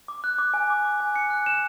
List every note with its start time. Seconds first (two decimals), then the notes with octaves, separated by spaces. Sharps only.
0.08 D6
0.24 F#6
0.39 D6
0.54 G#5
0.70 D6
0.85 D6
1.00 G#5
1.16 C#7
1.30 F#6
1.46 E7